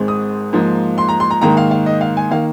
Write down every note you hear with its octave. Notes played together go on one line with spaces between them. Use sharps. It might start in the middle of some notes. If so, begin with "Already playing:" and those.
Already playing: G#1 G#2 G#3 C4
D#6
G#2 F3 A#3
C6
A#5
C6
A#5
G#2 D#3 A#3 A#5
F5
F5
D#5
F5
G#5
D#3 A#3 F5